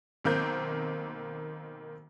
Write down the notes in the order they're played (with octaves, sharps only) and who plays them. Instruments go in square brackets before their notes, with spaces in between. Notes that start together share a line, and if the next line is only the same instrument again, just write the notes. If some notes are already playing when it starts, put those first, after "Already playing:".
[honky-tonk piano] B1 D#3 A#3 C4 G6